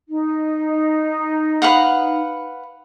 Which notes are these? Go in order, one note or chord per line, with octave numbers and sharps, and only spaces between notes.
D#4
B4 F5 F#5